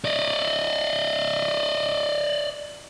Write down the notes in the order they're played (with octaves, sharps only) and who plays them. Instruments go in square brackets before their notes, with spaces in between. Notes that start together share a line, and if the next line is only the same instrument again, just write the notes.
[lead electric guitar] D5 D#5